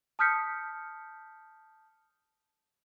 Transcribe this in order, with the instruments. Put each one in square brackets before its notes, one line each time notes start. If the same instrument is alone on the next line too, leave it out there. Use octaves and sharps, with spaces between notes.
[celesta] A5 D#6 F6 G6 B6 C#7